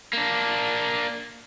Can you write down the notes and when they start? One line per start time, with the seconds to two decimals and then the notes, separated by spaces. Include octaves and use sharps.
0.13 A#3 D4